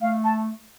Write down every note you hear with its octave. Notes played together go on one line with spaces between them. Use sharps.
A3 F5
A5